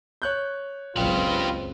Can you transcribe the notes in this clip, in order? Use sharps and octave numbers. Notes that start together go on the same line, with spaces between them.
C#5 F#6 G6
F#1 C#2 C4 F4 G4 B4